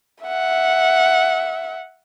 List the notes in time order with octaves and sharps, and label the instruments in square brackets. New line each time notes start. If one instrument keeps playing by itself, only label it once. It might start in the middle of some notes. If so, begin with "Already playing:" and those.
[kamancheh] E5 F#5